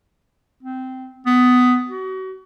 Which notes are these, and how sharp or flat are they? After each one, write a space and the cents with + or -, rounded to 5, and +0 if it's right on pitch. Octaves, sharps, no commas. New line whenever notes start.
C4 -15
B3 +15
F#4 +35